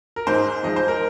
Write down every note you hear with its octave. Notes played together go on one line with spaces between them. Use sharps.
A#4
G#2 G#3 C5
G#2 F3 G#3 D#5
C5
A#4